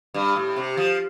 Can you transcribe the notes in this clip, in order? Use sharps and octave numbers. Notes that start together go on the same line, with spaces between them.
G2
A2
C3
F3